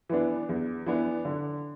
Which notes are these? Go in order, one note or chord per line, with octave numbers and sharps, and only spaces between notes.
E3 B3 D4
E2
E3 B3 D4
D3